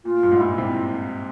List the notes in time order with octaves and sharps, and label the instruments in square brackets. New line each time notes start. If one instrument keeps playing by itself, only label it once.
[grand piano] A#2 [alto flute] F4
[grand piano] G2
G#2
[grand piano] A#2 [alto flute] E4
[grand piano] C3